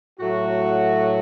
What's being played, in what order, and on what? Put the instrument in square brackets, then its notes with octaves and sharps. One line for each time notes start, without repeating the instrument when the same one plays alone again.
[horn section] A2 F#3 A3 F#4